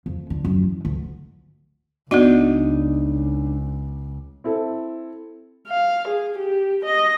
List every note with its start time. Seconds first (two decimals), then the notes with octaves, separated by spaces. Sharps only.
0.06 F2
0.30 D3
0.45 F#2
0.62 E3
0.85 D2
2.11 C#2 B3 D4 D#4 F#4
4.44 C4 E4 A4
5.68 F5
6.08 G#4
6.38 G4
6.85 D#5